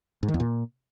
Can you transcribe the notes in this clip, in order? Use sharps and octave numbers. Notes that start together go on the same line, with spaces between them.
G#2
D#3
E2
A#2